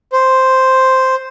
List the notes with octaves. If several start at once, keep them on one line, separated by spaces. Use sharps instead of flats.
C5